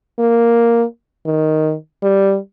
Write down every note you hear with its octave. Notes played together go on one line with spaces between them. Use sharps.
A#3
D#3
G3